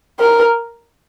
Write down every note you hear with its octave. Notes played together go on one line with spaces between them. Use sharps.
A#4